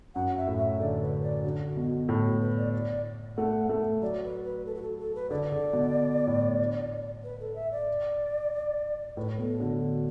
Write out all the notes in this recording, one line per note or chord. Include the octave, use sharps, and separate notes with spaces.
F#2 F#5
E5
A2
E5
D3 D5
B4
D5
D3 F#4
B2
A2 F#4
F#4
B4
D5
D5
A3 F#5
A3
F#3 D5
B4
B4
A4
F#4
A4
A4
B4
D3 D5
D3
B2
A2
B4
A4
E5
D5
A2 B4
B2 A4
D3 F#4
F#4